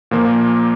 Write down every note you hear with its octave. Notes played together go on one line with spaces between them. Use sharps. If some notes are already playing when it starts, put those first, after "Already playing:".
A#2 F3 A#3